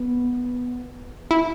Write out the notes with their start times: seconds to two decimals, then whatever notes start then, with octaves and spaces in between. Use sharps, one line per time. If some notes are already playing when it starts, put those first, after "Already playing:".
Already playing: B3
1.31 E4